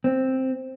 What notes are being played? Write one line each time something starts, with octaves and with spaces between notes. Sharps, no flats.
C4